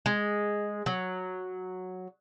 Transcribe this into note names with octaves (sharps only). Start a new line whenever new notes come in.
G#3
F#3